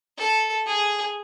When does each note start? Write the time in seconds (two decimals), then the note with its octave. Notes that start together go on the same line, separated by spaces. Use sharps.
0.18 A4
0.67 G#4